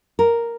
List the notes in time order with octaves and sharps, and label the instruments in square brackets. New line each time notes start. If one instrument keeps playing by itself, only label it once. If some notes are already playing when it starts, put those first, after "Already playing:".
[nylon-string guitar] A#4